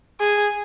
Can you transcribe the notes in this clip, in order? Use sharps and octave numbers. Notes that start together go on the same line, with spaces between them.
G#4